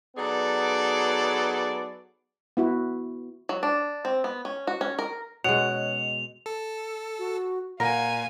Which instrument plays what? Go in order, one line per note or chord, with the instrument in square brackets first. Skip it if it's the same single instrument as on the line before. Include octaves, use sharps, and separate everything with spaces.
[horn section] F#3 B3 D#4 G#4 A4 D5
[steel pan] B3 E4 F#4
[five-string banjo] F#3
D4
C4
B3
C#4
F#4
C#4
A#4
[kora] B2 G#3 [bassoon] C#4 [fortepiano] F#5 [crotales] F7
[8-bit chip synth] A4
[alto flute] F#4
[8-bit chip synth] A#2 [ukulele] A#4 [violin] F5 G#5 [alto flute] F#5